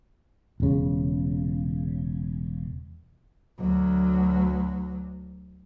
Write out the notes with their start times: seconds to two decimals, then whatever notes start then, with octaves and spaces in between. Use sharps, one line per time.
0.60 E1 C#3
3.60 D2 F#3